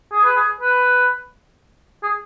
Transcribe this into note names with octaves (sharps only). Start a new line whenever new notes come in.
G#4
B4
G#4
B4
G#4